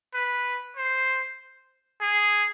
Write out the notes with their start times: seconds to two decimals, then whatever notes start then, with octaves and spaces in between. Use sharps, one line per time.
0.14 B4
0.77 C5
2.01 G#4